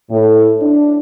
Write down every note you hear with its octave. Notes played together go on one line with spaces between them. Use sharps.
A2
D4